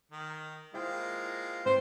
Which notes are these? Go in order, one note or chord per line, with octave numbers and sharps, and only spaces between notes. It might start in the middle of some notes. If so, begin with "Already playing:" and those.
D#3
G#3 A#3 E4 F4 C5 G5
G#2 C4 B4 C5 G5